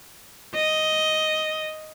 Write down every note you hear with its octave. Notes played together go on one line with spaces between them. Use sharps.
D#5